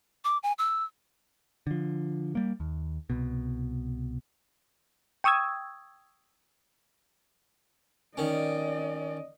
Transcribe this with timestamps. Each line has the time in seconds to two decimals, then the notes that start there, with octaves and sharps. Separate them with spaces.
0.24 D6
0.43 G#5
0.58 E6
1.67 D3 F3
2.35 G3 A#3
2.60 D#2
3.10 C2 B2
5.24 G5 C#6 D#6 E6 G#6
8.17 D#3 C#4 D5 D#5